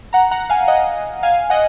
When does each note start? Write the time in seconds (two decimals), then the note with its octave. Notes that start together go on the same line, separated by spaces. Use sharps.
0.13 F#5 A#5
0.31 F#5 A#5
0.50 F5 G#5
0.68 D#5 F#5
1.23 F5 G#5
1.50 D#5 F#5